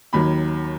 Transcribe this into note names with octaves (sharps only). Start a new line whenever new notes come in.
D#2 D#3 F#3 B5